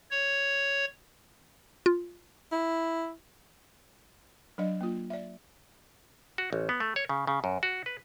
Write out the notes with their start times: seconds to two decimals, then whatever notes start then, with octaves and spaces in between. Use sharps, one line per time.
0.11 C#5
1.86 F4
2.52 E4
4.58 F#3 D4 D5 D#5
4.81 A#3 F4
5.10 D5 E5
6.38 F#4
6.53 A1
6.69 B3
6.80 A3
6.96 C#5
7.09 C#3
7.27 C#3
7.44 F#2
7.63 F#4
7.86 B4